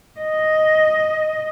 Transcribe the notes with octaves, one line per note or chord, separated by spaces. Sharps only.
D#5